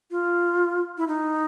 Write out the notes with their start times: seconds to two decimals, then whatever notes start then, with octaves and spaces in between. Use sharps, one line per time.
0.11 F4
0.98 E4
1.08 D#4